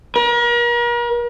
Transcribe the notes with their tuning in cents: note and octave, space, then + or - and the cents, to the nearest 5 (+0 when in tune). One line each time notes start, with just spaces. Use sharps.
A#4 +40